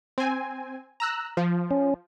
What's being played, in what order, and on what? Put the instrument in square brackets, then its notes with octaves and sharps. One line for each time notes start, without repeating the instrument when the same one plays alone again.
[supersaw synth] C4 G#5
A#5 E6 F#6
F3
[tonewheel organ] C#4